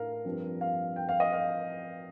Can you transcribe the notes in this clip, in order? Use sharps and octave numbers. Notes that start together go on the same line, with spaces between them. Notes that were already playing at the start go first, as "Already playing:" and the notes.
Already playing: A2 A3 D4 A#4 F5
G2 F3 C4
F5
G5
F5
D#5
F5